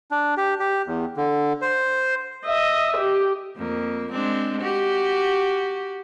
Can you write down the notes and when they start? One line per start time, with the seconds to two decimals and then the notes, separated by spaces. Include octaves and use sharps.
0.11 D4
0.37 G4
0.60 G4
0.87 E2
1.17 D3
1.61 C5
2.46 D#5 E5
2.97 G4
3.56 F2 A#3
4.11 G#3 C4 D4
4.61 F#4 G4